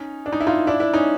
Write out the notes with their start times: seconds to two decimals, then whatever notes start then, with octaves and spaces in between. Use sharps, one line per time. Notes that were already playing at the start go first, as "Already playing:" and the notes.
Already playing: C#4 D#4
0.26 D4
0.32 D#4
0.40 E4
0.47 D#4 F4
0.67 D4 E4
0.80 D4 E4
0.94 C#4 D#4